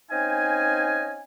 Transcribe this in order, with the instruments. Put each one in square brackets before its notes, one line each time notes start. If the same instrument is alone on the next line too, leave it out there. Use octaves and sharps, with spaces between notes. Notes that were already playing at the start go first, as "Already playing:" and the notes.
[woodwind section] C4 C#4 D#4 D#5 F5 G#5